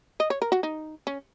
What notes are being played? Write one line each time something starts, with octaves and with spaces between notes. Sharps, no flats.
D#5
C#5
A#4
F#4
D#4
C#4